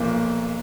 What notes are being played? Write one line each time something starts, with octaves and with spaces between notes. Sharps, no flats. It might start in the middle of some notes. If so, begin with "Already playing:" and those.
Already playing: B1 A#2 F3 A#3